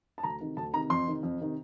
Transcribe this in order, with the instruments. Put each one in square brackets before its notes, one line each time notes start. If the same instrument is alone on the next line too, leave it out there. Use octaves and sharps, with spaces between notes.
[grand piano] A5
D2 A#5
C3 D#3
D2 A5
C3 D#3 A#5
F2 C6
C3 D#3
F2
C3 D#3